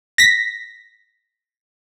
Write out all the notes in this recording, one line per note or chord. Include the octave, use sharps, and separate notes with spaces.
A#6 B6